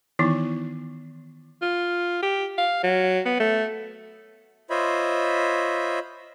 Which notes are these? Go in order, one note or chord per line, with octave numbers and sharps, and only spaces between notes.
D#3 E3 B3 D#4 E4
F4
G4
F5
F#3
B3
A3
F4 C5 C#5 D#5 E5 B5